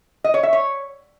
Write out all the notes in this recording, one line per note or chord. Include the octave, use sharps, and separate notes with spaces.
D#5
C#5
E5
C#5